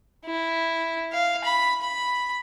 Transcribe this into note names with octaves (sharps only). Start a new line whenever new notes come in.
E4
F5
B5
B5